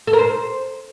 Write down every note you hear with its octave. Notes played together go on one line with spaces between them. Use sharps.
A4
A#4
C5